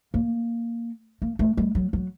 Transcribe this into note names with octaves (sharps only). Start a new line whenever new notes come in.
A#3
A#3
A3
G3
F#3
F#3